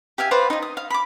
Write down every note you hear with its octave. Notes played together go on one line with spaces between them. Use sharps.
G4 E5 F5 G#5
B4 C5 D5 F5
D#4 D#5
D#6
F5
B5 D6